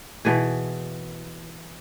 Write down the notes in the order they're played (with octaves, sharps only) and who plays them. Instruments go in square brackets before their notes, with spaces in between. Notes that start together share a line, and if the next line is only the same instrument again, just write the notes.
[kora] B2 E3 G#4